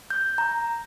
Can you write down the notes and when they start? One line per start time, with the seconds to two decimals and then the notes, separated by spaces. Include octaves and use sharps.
0.10 G6
0.38 A#5